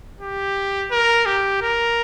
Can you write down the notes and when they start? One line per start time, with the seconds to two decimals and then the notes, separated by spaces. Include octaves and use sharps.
0.21 G4
0.92 A#4
1.26 G4
1.62 A#4